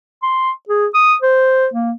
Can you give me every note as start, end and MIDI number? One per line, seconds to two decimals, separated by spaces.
0.23 0.51 84
0.69 0.86 68
0.94 1.15 87
1.22 1.68 72
1.73 1.92 58